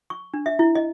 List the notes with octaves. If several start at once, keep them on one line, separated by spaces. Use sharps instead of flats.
C#6
D4
E5
E4
D#5